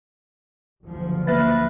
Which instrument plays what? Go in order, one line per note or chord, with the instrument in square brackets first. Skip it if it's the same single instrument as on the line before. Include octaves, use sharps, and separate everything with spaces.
[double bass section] F#1 D2 F3
[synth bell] A#3 E5 A6 [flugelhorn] B4